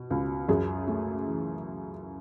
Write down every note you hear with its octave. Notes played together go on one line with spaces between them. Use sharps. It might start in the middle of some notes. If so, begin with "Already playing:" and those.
Already playing: B2
C#2
F#2 G#4
A3
E3